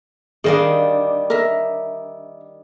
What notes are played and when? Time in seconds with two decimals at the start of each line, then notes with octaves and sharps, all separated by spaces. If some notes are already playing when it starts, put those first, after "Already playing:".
0.44 D#3 G3 D4 G#4 D#5 F5
1.30 A#4 E5